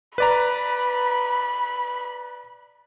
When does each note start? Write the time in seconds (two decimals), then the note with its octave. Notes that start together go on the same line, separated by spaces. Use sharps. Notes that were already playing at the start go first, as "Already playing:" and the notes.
0.18 B4 D5 A#5 B5